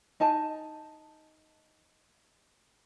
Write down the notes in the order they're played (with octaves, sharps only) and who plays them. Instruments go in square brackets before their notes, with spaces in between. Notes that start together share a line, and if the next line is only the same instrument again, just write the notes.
[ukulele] D#4 G#5 A5